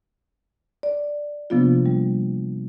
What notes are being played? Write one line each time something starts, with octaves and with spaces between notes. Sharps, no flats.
D5
C3 F3 A#3 B3 D4 F4
G3